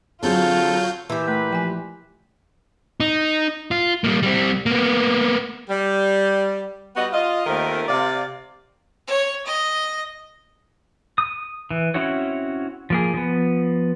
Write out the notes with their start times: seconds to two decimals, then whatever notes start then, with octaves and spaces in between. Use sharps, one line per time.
0.22 D3 F#3 C4 F4 G#4 A4 G6
1.10 A#2 E3 G4 E6
1.28 A3 B4
1.51 F3 G5 G#5
3.00 D#4
3.71 F4
4.04 G3 A#3
4.23 G3 C4
4.66 A#3 B3
5.70 G3
6.96 G3 B3 F#4 G4 D#5 F#5
7.13 F4 D#5
7.46 D#2 D#3 A3 C4 F4 A#4
7.88 C3 D5 F5
9.07 C#5
9.46 D#5
11.18 D#6
11.71 E3
11.94 C4 C#4 E4 F#4 C#5
12.90 F3 A#3 G#4
13.14 F3 B3